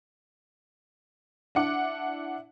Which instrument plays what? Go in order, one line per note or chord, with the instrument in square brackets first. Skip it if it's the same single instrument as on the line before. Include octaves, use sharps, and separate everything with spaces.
[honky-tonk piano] D4 E4 F#5 D6